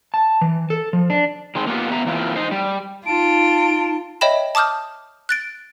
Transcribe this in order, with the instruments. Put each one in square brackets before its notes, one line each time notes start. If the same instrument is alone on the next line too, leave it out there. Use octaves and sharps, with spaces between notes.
[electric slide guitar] A5
E3
A4
F3
D4
D#3 G#3 C4
A#3 B3 F4 G4
B3 E5 A#5
E3 A#3 C4 E4 F4 A#4
D#4 C5
G3
[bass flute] D#4 [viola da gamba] F4 [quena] A5 [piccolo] D7
[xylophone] C#5 D#5 E5 G5 B5 E7
A5 D6 D#6 F6 G6
F#6 A6 D7